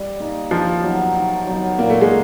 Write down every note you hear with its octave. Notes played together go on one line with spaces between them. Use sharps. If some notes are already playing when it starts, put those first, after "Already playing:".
Already playing: G3
A#3 D#4
D#3 F3
F#3 B3 D#4
D#3
F#3 B3 D#4
A#2 A#3
A3
G#3